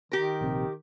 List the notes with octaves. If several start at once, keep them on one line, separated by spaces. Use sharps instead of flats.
D#3 G4 A#4
A#1 C3